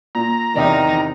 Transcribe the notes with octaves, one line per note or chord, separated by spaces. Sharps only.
A#2 A#5
E2 C3 D#3 D#4 D5 E5